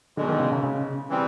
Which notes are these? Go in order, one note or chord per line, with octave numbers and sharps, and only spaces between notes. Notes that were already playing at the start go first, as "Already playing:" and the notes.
E2 B2 D3 G#3
D#3
C#3
C#3
C#3
E3 G3 C4